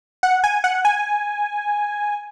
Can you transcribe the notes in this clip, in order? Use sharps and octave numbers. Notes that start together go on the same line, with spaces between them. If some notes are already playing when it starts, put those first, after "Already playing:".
F#5
G#5
F#5
G#5